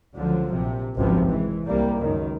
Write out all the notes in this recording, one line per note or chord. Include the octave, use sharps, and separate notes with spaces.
C#2 D3 F3 F#3
A#1 C3
G#1 C#2 F#2 C3 F3 B3
E3 G#3
C2 G3 A#3
C#2 F#2 D#3